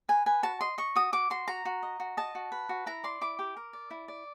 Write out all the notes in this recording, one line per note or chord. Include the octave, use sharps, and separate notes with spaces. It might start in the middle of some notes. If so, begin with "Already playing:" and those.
B4 G#5
B4 G#5
F#4 A5
D#5 C6
D#5 C#6
F#4 D#6
F#4 D6
F#4 C6
F#4 A#5
F#4
D#5
F#4
D#5 A5
F#4
B4
F#4
E4 A#5
D5 C6
E4 D6
G4
A#4
D5
E4
D5